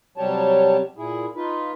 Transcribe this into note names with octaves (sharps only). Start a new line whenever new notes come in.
C3 F#3 G3 G4 C#5 A5
A#2 E4 G#4
D#4 F4 B4